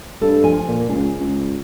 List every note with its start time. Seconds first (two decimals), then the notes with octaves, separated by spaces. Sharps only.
0.22 G2 A4
0.44 F3 G#5
0.68 A#2
0.89 C#2 G#4
1.20 C#2